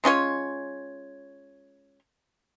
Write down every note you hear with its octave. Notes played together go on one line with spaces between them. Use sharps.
G#3 C#4 F4 C#5